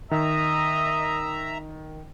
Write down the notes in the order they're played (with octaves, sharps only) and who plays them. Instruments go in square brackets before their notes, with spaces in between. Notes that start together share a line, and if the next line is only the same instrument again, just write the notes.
[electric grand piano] D#3 [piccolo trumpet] D#5 [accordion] E5 A#5